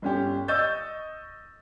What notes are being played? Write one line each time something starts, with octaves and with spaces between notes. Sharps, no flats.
G1 C#4 G4
D#5 C#6 E6 G6 A6